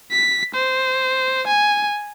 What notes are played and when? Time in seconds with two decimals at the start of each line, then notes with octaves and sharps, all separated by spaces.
0.12 B6
0.55 C5
1.47 G#5